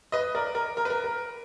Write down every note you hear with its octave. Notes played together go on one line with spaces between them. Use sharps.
B4 D#5
A#4 D5
A#4
A#4
B4
A#4
A#4